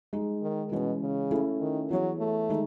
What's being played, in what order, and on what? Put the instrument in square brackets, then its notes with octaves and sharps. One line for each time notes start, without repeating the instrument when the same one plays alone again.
[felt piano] G#3 D#4 G#4
[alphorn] D#3
[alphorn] B2 [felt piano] E3 G#3 C#4
[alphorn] C#3
[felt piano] A3 C#4 E4 A4
[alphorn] D#3
[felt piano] E3 B3 E4 G#4 C#5 [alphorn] F#3
[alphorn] A3
[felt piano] D#3 G#3 D#4 G#4